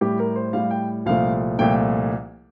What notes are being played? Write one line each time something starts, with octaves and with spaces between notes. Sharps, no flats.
A2 G3 G4
A#4
C5
A2 G3 F5
G5
C2 A#2 F3 A3 F5
C2 A#2 F3 A3 G5